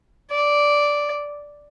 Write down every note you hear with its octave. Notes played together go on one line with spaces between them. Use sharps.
D5